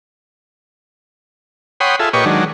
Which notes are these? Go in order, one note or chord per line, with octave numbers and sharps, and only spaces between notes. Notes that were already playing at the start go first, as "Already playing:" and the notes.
C#5 F#5 G5 B5 C6 D#6
F4 G#4 A4 E5
A#2 G4 B4 C#5 D#5 C#6
D#3 F#3 G#3 D4